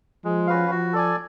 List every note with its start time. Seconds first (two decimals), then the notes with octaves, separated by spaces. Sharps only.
0.24 F3 G#3
0.47 C#4 F#4 B4 F5
0.71 F3 F#4
0.93 A4 D5 G#5